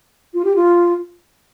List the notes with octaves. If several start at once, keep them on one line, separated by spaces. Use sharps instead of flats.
F4
G4
F4